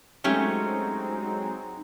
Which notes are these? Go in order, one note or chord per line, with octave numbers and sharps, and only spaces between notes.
F#3 G#3 A3 C4 C#4 D#4 G4